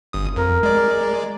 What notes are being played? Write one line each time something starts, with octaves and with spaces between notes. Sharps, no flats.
G1 D#6
F2 A#4
G#3 D5